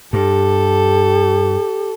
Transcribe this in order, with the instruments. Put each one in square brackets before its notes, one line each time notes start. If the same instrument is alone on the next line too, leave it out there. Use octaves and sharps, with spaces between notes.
[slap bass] G2 [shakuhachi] G4 [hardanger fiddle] A4